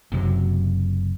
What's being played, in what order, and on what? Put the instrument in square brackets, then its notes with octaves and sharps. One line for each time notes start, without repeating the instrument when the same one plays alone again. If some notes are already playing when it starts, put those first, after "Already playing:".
[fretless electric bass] F#1 F#2 C3 F#3